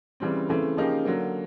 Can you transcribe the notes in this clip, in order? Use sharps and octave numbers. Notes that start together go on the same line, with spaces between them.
C#3 E3 G3 C4
C#3 E3 A3 C4
C#3 F3 A#3 D#4 G4
D3 F#3 A#3